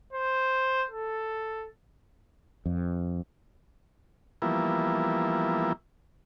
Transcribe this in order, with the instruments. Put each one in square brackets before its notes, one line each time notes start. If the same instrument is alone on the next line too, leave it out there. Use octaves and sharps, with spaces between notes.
[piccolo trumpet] C5
A4
[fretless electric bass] F2
[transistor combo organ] E3 F3 G3 A#3 B3 E4